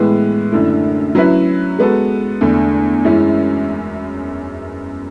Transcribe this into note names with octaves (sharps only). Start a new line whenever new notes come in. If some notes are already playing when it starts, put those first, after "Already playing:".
Already playing: A2 E3 G#3 B3
F#2 D3 A3 E4
F#3 C#4 E4 B4 E5
G#3 B3 F#4 A4
E2 D3 A3
F#2 E3 G#3 C#4 E4